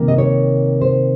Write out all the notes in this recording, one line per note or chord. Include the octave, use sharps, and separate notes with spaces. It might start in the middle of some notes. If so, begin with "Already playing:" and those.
Already playing: C3 D#3 A#3
D#5
C#5
C5